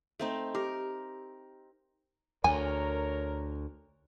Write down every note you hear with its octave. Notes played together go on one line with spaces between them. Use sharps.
A3 C4 D#4
G4 A#4 D6
D2 A#4 C#5 G#5